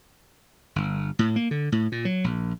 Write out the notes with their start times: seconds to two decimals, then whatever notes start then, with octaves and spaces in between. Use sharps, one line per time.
0.76 G1
1.19 A2
1.36 A#3
1.51 D3
1.72 A2
1.92 A#2
2.05 F#3
2.24 A#1